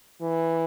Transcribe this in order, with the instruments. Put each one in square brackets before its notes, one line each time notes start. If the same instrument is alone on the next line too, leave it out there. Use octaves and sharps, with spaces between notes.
[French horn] E3